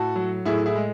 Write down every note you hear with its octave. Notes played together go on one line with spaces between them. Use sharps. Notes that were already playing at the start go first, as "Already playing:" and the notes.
Already playing: A2 F#4 A4
F#3
A2 E4 G#4
E4 G#4
G#3